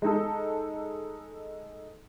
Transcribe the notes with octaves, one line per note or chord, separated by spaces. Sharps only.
G#3 D#4 A4